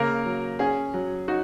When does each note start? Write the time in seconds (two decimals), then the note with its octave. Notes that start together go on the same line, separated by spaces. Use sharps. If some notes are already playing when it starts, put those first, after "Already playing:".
Already playing: C#3 A#3 A#4
0.26 F#3
0.59 C#4 G#4
0.94 F#3
1.28 D#4 F#4